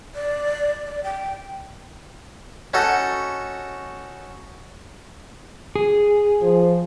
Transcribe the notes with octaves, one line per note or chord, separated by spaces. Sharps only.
D5
D5
G5
C#4 D#4 F#4 A4
G#4
F3